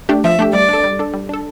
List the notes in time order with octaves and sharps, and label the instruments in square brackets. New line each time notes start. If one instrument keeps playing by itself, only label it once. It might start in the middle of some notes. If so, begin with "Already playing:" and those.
[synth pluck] A3 D4 G4
[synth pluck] F3 [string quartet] E5
[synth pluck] A3 D4 G4
[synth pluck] G3 [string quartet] D5
[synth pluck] D4 A4
G3
D4 A4
G3
D4 A4